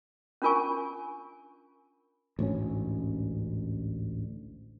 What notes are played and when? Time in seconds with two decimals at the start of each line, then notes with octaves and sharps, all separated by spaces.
0.42 C#4 D4 F4 A#4 G#5 C#6
2.39 A1 D2 G#2 C#4